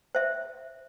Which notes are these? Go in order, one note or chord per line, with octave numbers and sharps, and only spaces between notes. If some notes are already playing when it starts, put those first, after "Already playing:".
C5 E5